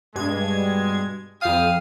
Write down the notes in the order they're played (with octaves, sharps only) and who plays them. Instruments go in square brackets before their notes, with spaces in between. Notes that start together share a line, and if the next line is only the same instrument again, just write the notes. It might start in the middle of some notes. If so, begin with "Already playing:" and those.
[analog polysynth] G2 G#6 [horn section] B2 G#3
[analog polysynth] F2 D#6 [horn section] F5 G5